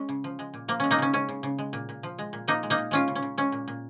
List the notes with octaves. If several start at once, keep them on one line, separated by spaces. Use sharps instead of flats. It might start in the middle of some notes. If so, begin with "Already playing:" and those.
Already playing: G#3 C#4
C#3
F3
G#3
A#2
F3 A#3
G#3 C#4
A#3 D#4
C#3 C#4
G#3 C#4
C#3
C#3
G#3
A#2
A#2
F3
G#3
A#2
F3 A#3 D#4
G#3
A#3 D#4
A#2
G#3 C#4 F4
C#3
C#4
C#3
G#3 C#4
A#2
A#2